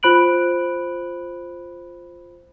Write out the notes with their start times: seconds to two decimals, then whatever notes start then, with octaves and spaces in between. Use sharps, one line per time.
0.03 F4 C5 B5 F#6 D7 F#7